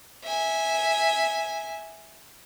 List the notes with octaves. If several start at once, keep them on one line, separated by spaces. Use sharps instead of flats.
E5 G#5